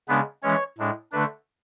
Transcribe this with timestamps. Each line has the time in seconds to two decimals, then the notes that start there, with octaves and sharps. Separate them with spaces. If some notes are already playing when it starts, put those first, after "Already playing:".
0.08 C#3 G#3 B3 D4 B4
0.43 E3 G#3 C#4 C#5
0.78 A2 G#3 D4
1.12 D3 A3 D4 B4